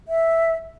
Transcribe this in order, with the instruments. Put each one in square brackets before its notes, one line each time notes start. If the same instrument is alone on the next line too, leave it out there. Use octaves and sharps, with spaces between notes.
[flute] E5